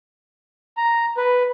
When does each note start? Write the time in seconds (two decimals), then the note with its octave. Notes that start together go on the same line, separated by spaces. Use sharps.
0.77 A#5
1.17 B4